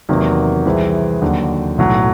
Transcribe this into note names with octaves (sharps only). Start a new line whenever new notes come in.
E2 C3 D#3 F#3 A#3
C2 C3 E3 G#3 C4
D#2 D3 F#3
B1 A2 F#3